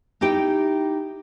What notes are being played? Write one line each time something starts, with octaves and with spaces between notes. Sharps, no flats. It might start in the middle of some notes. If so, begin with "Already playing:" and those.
D#4 E4 G4 G5